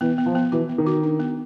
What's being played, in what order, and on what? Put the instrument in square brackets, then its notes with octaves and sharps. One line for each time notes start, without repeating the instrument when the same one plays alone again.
[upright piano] E3 [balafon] B3
[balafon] B3
[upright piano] F3
[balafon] B3
[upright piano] E3 [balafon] F#4
[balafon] B3
[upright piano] D#3
[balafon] F#4
D4
B3